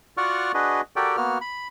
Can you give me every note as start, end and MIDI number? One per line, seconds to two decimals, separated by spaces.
0.17 0.52 65
0.17 0.52 66
0.17 0.52 74
0.17 0.52 78
0.17 0.52 85
0.17 0.52 89
0.54 0.81 62
0.54 0.81 66
0.54 0.81 68
0.54 0.81 71
0.54 0.81 75
0.96 1.16 66
0.96 1.16 67
0.96 1.16 69
0.96 1.16 70
0.96 1.16 74
0.96 1.16 79
1.17 1.38 58
1.17 1.38 59
1.17 1.38 66
1.17 1.38 89
1.41 1.68 83